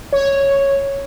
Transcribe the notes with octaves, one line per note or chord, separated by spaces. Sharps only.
C#5